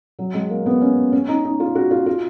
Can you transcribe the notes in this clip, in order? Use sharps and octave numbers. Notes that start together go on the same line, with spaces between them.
F#3
G#3
A#3
B3
C#4
C#4
D#4
D#4
F4
F#4
F4
F4